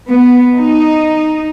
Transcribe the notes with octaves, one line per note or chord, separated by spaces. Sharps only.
B3
D#4